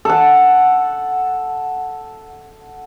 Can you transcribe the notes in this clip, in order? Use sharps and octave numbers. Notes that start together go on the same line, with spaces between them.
A4 F#5